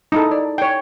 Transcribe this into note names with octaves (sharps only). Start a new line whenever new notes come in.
D#4 E4 A4
D5
C#5 G5